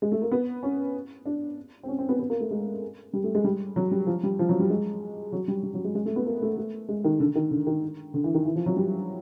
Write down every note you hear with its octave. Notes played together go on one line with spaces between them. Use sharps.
G#3
A3
A#3
B3
C#4
D4
C4
C#4
C4
B3
B3
A#3
A3
G#3
G3
A3
G#3
G3
F#3
G3
F3
G3
F3
F#3
G3
G#3
F#3
G3
G3
F#3
G#3
G#3
A3
B3
A#3
A3
A3
G#3
D#3
D3
D#3
D3
D#3
D3
E3
D#3
E3
F3
F#3
G3